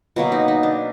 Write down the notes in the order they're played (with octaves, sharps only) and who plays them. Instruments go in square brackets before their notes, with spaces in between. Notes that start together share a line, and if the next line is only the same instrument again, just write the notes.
[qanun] B2 F#3 A#3
D#4
D#4
D4